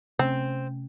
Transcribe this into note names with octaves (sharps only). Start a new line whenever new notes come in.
C3 A3 C4 C#4